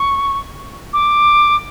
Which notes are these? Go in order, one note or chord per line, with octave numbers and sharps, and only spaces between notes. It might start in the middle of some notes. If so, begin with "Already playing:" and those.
Already playing: C#6
D6